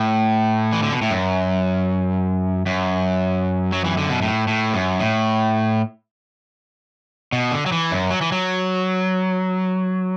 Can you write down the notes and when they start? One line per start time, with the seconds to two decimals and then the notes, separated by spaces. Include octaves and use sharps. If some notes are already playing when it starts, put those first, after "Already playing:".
Already playing: A2
0.73 E3
0.83 D3
0.92 B2
1.02 A2
1.11 F#2
2.66 F#2
3.72 F#3
3.84 E3
3.97 D3
4.09 B2
4.22 A2
4.48 A2
4.74 F#2
5.00 A2
7.32 B2
7.51 D3
7.66 F#3
7.72 E3
7.91 F#2
8.10 F#3
8.21 E3
8.32 F#3